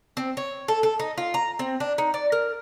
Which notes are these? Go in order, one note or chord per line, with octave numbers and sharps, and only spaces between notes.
C4
C#5
A4
A4
D#4
F4
A#5
C4
D4
D#4
D5
A#4